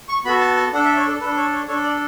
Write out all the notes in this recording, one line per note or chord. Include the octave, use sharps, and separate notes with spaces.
C#6
B3 F#4 A4 B5
A5
A5
D4 A4 F#5
E5
C#5
A4
A4 B4
D4
C#5
C#5
D4 A4 C#5
D5